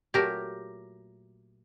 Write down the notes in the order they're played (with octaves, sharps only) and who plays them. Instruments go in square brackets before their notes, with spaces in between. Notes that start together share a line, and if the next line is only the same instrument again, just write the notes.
[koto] A#2 F#3 A3 G4 A#4